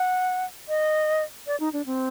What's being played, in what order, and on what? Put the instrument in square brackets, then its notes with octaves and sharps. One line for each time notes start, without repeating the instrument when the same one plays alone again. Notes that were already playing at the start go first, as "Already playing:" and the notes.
Already playing: [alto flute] F#5
D#5
D5
D#4
D4
C4